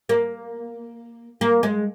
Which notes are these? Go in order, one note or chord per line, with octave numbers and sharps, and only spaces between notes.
A#3
A#3
G#3